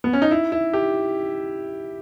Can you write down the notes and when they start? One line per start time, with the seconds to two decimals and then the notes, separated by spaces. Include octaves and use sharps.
0.04 B3
0.13 C#4
0.22 D#4
0.31 E4
0.52 E4
0.73 G4